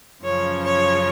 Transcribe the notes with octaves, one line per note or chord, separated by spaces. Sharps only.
F#2 C#3 F3 C#5
C#5